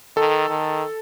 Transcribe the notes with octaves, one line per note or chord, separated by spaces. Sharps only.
D#3 A4
D#3